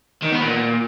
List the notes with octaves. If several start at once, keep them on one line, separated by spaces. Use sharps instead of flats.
D#3
B3
A#2